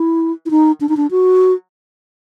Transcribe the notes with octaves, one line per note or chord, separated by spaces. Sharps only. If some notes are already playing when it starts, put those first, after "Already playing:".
Already playing: E4
E4
D#4
D4
D#4
D4
F#4